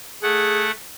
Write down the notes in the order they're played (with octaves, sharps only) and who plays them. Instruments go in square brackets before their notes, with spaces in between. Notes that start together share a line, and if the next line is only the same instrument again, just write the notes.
[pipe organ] A3 F#5 [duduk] G#4